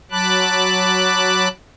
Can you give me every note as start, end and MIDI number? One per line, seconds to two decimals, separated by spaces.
0.11 1.48 54
0.11 1.48 81
0.11 1.48 83
0.11 1.48 86
0.11 1.48 90